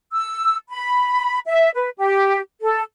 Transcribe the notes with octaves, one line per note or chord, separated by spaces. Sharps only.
E6
B5
E5
B4
G4
A4